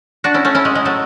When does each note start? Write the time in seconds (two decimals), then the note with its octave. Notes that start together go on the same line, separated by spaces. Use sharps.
0.24 D4 F#4
0.34 C#4 E4
0.45 A3 C#4
0.55 C#4 E4
0.65 G#3
0.75 G#3
0.85 F#3 A3